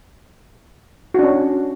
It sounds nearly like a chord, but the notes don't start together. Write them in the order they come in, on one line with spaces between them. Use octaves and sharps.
F#4 D4 C#4